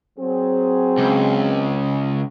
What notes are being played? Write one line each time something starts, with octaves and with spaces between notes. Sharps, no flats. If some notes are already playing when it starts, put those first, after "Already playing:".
F#3 C4 G#4
C#2